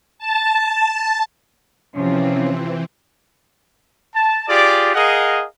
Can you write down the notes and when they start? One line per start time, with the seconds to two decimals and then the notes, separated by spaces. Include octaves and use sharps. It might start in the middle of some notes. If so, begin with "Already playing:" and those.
0.18 A5
1.94 C3 E3 F3 C4 C#4 F4
4.14 A5
4.48 F4 G4 G#4 D5
4.94 G#4 A#4 D#5 F5 F#5